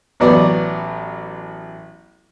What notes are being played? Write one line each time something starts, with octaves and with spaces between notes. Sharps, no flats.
A1 F#3 B3 B4 D5